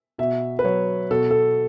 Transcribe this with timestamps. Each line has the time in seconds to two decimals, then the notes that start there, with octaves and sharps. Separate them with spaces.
0.18 B2 E5
0.59 B4
0.64 F#3 C#5
1.11 B2 A4
1.31 A4